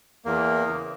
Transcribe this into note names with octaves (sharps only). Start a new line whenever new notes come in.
E2 A#3
C#3 E3